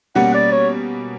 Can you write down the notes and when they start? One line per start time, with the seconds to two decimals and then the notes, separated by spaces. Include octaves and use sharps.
0.15 B2 G3 A#3 C#4 F#5
0.34 D5
0.52 C#5